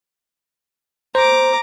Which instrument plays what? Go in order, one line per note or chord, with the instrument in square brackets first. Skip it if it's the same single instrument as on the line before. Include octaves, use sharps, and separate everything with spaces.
[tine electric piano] C5 [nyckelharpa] A#5 D6